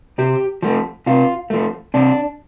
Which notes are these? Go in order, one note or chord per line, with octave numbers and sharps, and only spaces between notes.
C3 G4
F3 A3
C3 F4
F3 A3
C3 D4